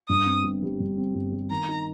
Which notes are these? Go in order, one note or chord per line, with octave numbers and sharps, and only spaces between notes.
G2 D#6
C4
G1
G3
G2
C4
G1
G3
D#3 A#5
D#4